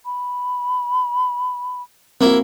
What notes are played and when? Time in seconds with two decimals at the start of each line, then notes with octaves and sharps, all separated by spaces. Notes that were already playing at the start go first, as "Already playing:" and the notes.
0.05 B5
2.21 A#3 C4 E4 F#4